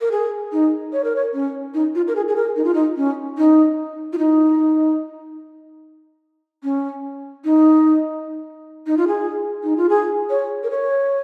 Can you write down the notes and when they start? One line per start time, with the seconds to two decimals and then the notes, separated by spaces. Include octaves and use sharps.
0.01 A#4
0.11 G#4
0.52 D#4
0.93 C#5
1.04 A#4
1.16 C#5
1.34 C#4
1.74 D#4
1.95 F4
2.08 A#4
2.15 G#4
2.28 G#4
2.36 A#4
2.56 D#4
2.64 F4
2.74 D#4
2.97 C#4
3.38 D#4
4.13 F4
4.18 D#4
6.63 C#4
7.45 D#4
8.87 D#4
8.97 F4
9.08 G#4
9.63 D#4
9.77 F4
9.89 G#4
10.30 C#5
10.63 A#4
10.70 C#5